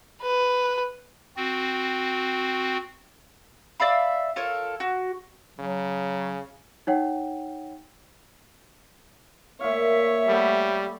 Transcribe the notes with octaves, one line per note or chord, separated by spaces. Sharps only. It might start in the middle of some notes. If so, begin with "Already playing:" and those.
B4
C4 F#4
D5 E5 F5 B5
F4 A4 A#4 C#5
F#4
C#3 F#3
D#4 C#5 F#5 G5
A#2 C#5 E5 F5
G3 A3 B3 G4